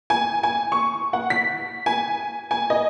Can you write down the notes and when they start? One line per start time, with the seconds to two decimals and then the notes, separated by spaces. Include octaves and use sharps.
0.10 G#5
0.43 G#5
0.72 C#6
1.13 F#5
1.30 B6
1.86 G#5
2.51 G#5
2.70 D#5